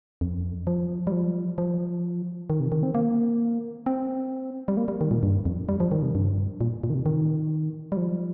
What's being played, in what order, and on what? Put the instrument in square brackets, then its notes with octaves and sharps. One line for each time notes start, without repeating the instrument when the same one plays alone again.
[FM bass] F2
F3
G3
F3
F3
D#3
C3
D#3
C4
A#3
C4
G3
A#3
G3
D#3
A#2
G2
F2
G3
F3
D#3
C3
G2
A#2
A#2
D#3
C3
D#3
G3
F3